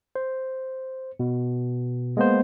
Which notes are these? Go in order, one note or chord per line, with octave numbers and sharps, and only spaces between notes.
C5
B2
G#3 A#3 B3 C5